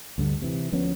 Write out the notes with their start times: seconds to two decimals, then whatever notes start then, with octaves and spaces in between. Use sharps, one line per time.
0.18 D2 G2 D3
0.42 C3 E3
0.72 D2 F3 B3 C#4